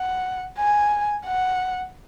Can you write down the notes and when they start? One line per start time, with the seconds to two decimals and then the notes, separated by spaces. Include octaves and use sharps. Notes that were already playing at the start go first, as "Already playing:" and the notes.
Already playing: F#5
0.58 G#5
1.26 F#5